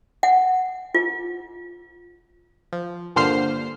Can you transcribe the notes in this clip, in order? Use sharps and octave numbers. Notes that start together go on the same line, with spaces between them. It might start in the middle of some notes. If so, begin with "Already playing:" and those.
F#5
F4
F3
G2 A#2 D3 C5 F6 C7